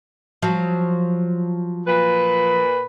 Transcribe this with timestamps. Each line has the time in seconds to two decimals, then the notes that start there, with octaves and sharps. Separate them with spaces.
0.42 F3 F#3
1.87 A#2 B4